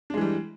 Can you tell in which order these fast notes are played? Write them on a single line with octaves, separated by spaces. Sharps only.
D4 G#3 E3 G3